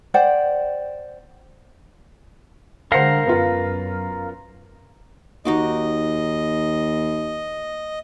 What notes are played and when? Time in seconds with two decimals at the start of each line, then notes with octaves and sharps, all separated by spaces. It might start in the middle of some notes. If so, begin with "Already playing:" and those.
0.14 C5 D5 F#5 G5
2.92 D3 G#3 A#4 C5 F5 F#5 A#5 C#7
3.27 F#2 B3 F4
5.45 D#2 D#4 F#4 D#5 D6